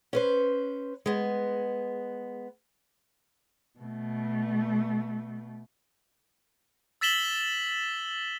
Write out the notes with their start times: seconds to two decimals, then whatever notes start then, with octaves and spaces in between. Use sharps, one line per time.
0.13 C#4 B4 C5
1.06 G#3 B3
3.79 B2 A3
7.01 E6 A6 B6 E7 F#7 G7